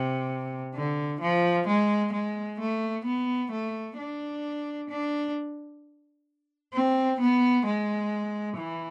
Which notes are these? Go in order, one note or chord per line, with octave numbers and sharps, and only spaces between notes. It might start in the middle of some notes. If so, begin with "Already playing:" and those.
Already playing: C3
D3
F3
G#3
G#3
A3
B3
A3
D4
D4
C4
B3
G#3
E3